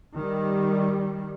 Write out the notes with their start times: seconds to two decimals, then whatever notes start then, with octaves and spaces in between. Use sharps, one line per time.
0.14 D#3 G3